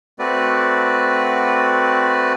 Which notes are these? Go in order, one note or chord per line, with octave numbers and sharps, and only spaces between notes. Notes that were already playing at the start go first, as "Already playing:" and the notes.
A3 C4 F#4 B4 D5